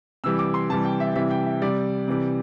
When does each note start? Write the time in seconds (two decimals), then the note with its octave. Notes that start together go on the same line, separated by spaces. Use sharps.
0.24 C3 E3 G3 E6
0.39 D6
0.54 C6
0.70 C3 E3 G3 A5
0.85 G5
1.00 E5
1.15 C3 E3 G3 E5
1.31 G5
1.46 E5
1.62 C3 G3 D5
2.08 C3 E3 G3